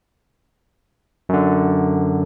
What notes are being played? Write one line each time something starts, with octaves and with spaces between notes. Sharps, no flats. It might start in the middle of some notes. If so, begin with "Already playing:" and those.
F#2 D3